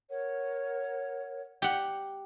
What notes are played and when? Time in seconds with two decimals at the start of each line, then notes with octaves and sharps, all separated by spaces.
0.10 A#4 C#5 F#5
1.62 G4 F#5